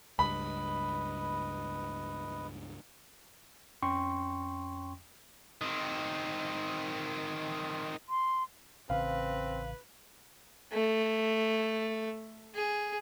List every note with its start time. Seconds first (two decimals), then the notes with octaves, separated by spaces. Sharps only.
0.19 C#2 G2 B4 D#5 B5
3.83 F2 C#4 G5 C6 C#6
5.62 D#3 C4
8.09 C6
8.90 A1 C#3 C4 B4 F5
10.73 A3
12.55 G#4